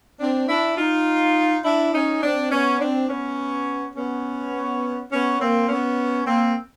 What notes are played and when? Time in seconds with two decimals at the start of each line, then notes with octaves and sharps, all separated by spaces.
0.20 C4 D4
0.49 D4 E4
0.78 D#4 F4
1.64 D4 E4
1.93 C#4 D#4
2.22 C4 D4
2.51 B3 C#4
2.80 C4 D4
3.09 B3 C#4
3.95 B3 C#4
5.11 B3 C#4
5.40 A#3 C4
5.69 B3 C#4
6.27 A#3 C4